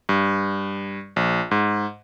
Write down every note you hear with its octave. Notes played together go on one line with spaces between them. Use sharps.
G2
A#1
G#2